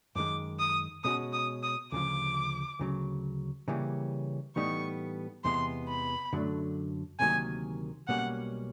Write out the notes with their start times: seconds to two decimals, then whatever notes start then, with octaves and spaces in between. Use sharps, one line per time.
0.16 F#2 D#3 G#3 D6
0.60 D#6
1.04 B2 G#3 C#4 F#4 D#6
1.33 D#6
1.63 D#6
1.92 D2 C#3 F3 D6
2.79 D2 C#3 F#3
3.68 C#3 E3 G3 A#3 C#4
4.56 A2 E3 G3 B3 D#4 C#6
5.44 E2 C3 E3 G#3 B3 C6
5.88 B5
6.33 F#2 D3 F#3 A3 D4
7.20 D2 C3 D#3 F#3 A#3 G#5
8.08 B1 B2 G3 A#3 C#4 F#5